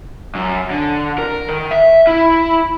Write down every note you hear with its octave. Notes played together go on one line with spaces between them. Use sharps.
F#2
D3
A#4
D#3
E5
E4